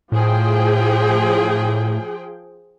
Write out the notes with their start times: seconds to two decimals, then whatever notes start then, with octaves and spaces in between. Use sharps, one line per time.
0.12 A2 F3 G#4 G5